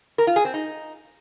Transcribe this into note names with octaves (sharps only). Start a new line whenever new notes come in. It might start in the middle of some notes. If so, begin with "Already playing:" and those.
A#4
F4
G#4
C4
D#4